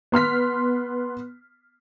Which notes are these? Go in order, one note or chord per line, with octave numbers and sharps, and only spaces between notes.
B3 C6 F6 B6